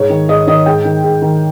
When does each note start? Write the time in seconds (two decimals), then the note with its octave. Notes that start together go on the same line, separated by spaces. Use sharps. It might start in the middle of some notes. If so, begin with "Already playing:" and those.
Already playing: G#2 C#5
0.10 D#3
0.29 G#2 D#5
0.47 D#3 D#5
0.66 G#2 G5
0.85 D#3
1.04 G#2
1.22 D#3